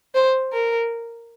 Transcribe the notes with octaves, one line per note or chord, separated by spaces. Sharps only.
C5
A#4